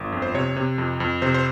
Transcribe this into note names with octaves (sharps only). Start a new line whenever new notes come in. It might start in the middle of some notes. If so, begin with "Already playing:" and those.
Already playing: G1
F2
C5
C3 C#5
C3
F2
F2
C3 C5
C5